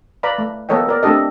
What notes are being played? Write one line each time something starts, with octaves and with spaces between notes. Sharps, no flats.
B4 D5 F5 A#5 B5
A3
A#3 B3 A4 C#5 D#5 G5
B3 A#4 D5
A3 C4 D4 G4 A4 D#5